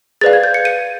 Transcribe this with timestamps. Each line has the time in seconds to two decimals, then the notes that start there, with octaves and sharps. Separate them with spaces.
0.21 G#4 B4 D5 F5 A6
0.33 G#6
0.44 G6
0.54 C#7
0.65 D#7